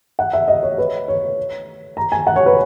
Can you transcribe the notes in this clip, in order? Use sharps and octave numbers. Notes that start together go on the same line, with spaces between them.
F#5
E5
D#5
C#5
B4
C#5
A#5
G#5
F#5
C#5
B4